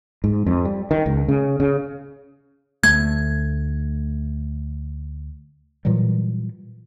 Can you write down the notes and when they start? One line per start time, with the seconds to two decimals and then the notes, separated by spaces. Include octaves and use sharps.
0.24 G#2
0.46 F2
0.65 G3
0.91 D#3
1.06 C#2
1.28 C#3
1.60 C#3
2.84 D2 A3 G#6
5.85 A#2 E3 F#3 G3